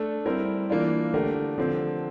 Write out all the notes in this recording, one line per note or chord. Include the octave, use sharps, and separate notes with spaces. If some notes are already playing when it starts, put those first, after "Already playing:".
Already playing: A3 D4 A4
G3 C4 E4 A#4
E3 A#3 D4 F4
D3 A3 D4 G4 A#4
D3 F3 C4